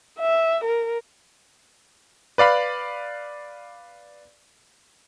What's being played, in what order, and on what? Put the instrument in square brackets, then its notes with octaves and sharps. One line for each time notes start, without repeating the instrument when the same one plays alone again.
[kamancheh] E5
A#4
[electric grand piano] B4 D5 F5 B5